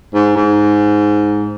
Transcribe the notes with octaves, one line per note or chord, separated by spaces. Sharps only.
G#2
G#2